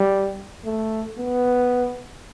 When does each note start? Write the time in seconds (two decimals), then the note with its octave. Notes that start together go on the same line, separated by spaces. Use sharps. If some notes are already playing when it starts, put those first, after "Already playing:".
Already playing: G3
0.65 A3
1.19 B3